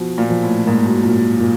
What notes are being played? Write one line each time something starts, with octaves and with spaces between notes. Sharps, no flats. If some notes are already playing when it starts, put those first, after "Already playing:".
Already playing: B2 F3
A#2
F3
A2
G#2 A#3
F#2
F#2 A#2
A#2